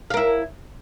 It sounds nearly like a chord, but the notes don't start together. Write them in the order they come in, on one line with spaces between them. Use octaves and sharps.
F5 A#4 E4